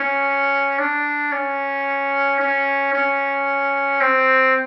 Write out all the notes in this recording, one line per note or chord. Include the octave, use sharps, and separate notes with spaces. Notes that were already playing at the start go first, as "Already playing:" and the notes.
Already playing: C#4
D4
C#4
C#4
C#4
C4